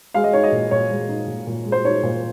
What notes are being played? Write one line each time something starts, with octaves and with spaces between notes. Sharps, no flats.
G#3 F5
D#5
D#4 C#5
D#5
A#2
A#2 C#5
G#3
D#4
A#2
A#2
G#3
C5
D#4 C#5
A#2